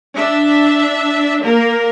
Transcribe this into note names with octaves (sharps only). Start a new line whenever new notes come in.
D4 E5
A#3 A#4